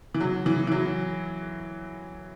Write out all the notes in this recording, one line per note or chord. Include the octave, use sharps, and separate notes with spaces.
E3
F#3
E3
E3
F#3